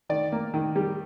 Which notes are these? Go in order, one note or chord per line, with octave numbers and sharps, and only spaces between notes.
D#3 D5
A#3
D#3
G3